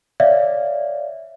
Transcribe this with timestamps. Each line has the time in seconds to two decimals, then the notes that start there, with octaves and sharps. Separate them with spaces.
0.20 C#5 D5 E5 F5